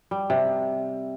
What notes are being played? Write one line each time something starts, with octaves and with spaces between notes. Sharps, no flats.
G3
C3